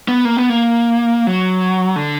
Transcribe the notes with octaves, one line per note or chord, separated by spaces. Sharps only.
B3
A#3
B3
A#3
F#3
D3